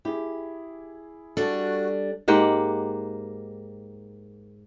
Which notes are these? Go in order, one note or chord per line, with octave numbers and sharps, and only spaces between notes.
E4 G4 G#4
G3 D4 F#4 A4
G#2 A#3 G4 F#5